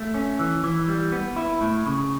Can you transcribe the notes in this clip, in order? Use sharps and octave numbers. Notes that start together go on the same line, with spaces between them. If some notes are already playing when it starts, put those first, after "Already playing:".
Already playing: A3
C#4
E3
E3
G3
B3
E4
A2
C#3